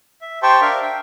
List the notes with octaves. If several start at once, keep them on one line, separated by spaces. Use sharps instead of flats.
E5
G4 C5 G5 A5 C6 C#6
D4 A#4 E5 F5
E5 G5